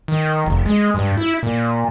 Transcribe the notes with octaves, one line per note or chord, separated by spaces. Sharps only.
D#3
F1
G#3
G2
E4
A#2